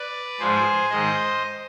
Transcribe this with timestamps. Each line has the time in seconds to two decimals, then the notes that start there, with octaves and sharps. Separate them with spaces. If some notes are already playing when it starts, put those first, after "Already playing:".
Already playing: B4 D5
0.40 G#2 F3 G#3 G#4 C5
0.90 G#2 D#3 G#3 C5 D#5